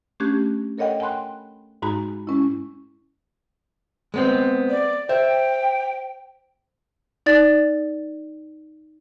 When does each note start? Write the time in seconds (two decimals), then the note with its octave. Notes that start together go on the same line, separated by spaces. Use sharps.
0.20 A3 C#4 D4 G4 F#6 G#6
0.78 A4 A#4 C#5 D#5 F#5 G5
1.00 G5 G#5 B5 C6 F#6
1.82 G#2 G#3 D#4 F#4 A#5 B5
2.27 G#3 C#4 E4
4.14 G#3 B3 C4
4.70 D5
5.09 C5 E5 G5
7.26 D#4 D5 A6